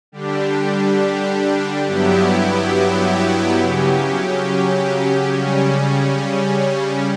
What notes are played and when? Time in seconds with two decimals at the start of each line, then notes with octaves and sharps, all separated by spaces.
0.12 D3 G3 D4 G4
1.86 G2 F#3 B3 E4 G4
3.59 C#3 F#3 C#4 G4
5.33 C#3 G3 C#4